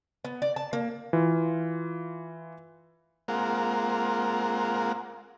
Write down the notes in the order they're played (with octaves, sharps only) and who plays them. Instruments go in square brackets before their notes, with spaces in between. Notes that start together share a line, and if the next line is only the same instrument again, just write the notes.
[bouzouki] B3
D5
A5
A#3
[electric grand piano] E3 F4
[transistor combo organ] G#3 A#3 C4 F4 A#4 F#5